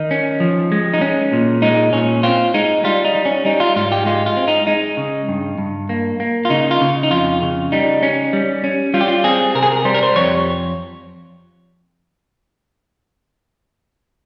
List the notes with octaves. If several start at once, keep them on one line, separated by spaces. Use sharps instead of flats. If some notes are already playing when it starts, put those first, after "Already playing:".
Already playing: D#3 D#4
C#4
F3
G#3
D#4
G#3 C#4
A#2
G#3 D#4
A#2 C#4
C4 F4
G#3 D#4
G3 F4
D#4
G3
C#4
G3 D#4
F4
G#2 F4
G4
G#3 F4
F4
C4
D#4
G#3 D#4
C#3
G2
G2
A#3
A#3
F4
C#3 D#4
F4
C#3
D#4
F2 F4
C#3
G3 D#4
C#4
G3
C#4
G3 F4
G4
F4
C4 G#4
C3 A#4
G#4
A#4
G3 C5
A#4
C5
F2 C#5